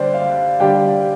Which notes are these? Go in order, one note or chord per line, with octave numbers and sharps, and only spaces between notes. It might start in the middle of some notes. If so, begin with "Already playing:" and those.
Already playing: D3 G3 D4 G4 C5 D5
F5
D3 G3 D4 G4 G5